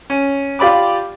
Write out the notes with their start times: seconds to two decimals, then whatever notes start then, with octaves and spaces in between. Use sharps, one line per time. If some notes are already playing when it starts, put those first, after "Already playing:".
0.10 C#4
0.59 F4 G4 D5 B5 D6